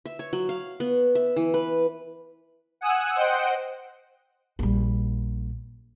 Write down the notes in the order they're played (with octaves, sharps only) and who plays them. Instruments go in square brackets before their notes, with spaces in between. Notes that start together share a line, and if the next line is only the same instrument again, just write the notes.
[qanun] E5
C#5
F#3
F5
B3
E5
E3
B4
[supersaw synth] F#5 G#5 D#6 E6 F#6
C5 D#5 F#5 G5
[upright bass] A#1 G3